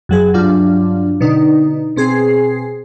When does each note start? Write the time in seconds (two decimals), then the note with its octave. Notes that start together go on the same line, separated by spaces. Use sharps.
0.09 F#2 F#3 G#4
0.34 G2 F#3 D4 F4
1.21 B2 D3 D#4
1.96 B2 C4 G#4 C7